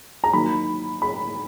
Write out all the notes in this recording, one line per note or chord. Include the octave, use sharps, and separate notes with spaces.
A#5
D#3 F#3 A#3 D#4 B5
B5